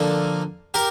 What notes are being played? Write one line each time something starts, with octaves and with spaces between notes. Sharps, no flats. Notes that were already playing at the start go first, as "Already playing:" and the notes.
Already playing: D3 F3 A#3 F4 A4
G4 A#4